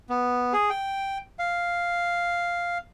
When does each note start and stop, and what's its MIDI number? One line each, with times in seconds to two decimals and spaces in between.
0.10 0.53 59
0.53 0.70 68
0.70 1.18 79
1.39 2.78 77